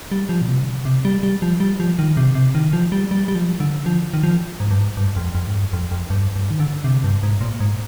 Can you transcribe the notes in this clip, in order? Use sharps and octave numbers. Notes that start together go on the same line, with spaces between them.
G3
F3
A#2
C3
D3
C3
C3
G3
G3
F3
G3
F3
D#3
C3
C3
D#3
F3
G3
G3
G3
F3
D3
F3
D#3
F3
G#2
G2
G#2
G2
F2
F2
G#2
G2
F2
F2
G2
G2
D#3
D3
C3
G2
G#2
A#2
G#2